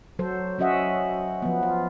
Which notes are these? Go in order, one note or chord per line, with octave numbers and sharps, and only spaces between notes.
F#3 A4 C5
F#3 C#4 F#4 D#5 E5 F#5
F3 B3
F4